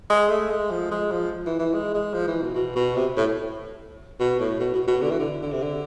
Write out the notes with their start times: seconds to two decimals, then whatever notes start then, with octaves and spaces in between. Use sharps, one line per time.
0.10 G#3
0.30 A3
0.50 G#3
0.71 F3
0.91 G#3
1.11 F3
1.46 E3
1.59 E3
1.74 G#3
1.94 G#3
2.14 F3
2.28 E3
2.42 B2
2.55 B2
2.75 B2
2.96 C3
3.17 A2
4.20 B2
4.40 A2
4.60 B2
4.74 B2
4.87 B2
5.02 D3
5.11 E3
5.19 D3
5.43 D3
5.52 C3
5.62 D3